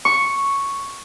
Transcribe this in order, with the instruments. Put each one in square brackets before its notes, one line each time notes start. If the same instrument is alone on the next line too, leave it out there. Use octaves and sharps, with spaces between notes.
[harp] C#6